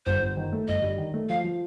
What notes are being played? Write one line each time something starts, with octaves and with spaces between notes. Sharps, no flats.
G1 C5
G1
D#3
A3
G1 D#5
G2
D#3
A3
F3 F5
F3